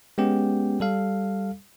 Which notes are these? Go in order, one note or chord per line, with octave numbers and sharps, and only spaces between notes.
G#3 B3 C#4 G4 G5
G3 A4 F5